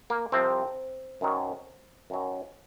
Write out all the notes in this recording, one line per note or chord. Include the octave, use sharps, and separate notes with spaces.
A#3
C2 C3 F3 C4
F#2 D#3 F#3
F#2 D#3 F#3